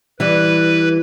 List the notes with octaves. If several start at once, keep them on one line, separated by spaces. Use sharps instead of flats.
E3 G3 B4